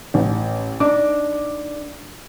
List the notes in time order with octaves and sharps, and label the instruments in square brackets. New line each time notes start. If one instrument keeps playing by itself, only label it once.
[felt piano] A1
[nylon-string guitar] D4 D#4 [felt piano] D6